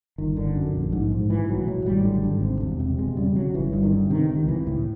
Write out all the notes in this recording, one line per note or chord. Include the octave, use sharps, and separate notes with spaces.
G1 D#3
D3
F#2
A#1
G#2
G#2
A2 E3
B1 F#3
A2 F#3
G#1 G3
D3
G#1
C3
E1
C3
E1 G#3
C#3 G3
C#3 F#3
G1 E3
G2
D#3
D3
C3 D#3
C#2 D#3
C#2 E3
A2